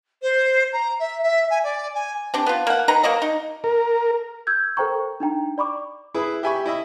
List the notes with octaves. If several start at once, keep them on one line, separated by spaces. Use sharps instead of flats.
C5
A#5
E5
E5
G#5
D5
G#5
C4 D4 G4
B3 F4
A#3 F#5
D#3 B4 A#5
A#3 F#4 D5 D#5
D#4
A#4
E6 G6 G#6
A4 A#4 C5 G5 A#5 C#6
D4 D#4 G5 A#5
D5 B5 C#6 D6
E4 G#4 B4
G4 E5 G#5 B5 C#6
E4 D#5 E5